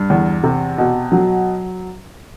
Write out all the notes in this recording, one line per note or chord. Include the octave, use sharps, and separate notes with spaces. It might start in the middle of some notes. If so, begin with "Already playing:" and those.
Already playing: G2
E2
C3
B2
F#3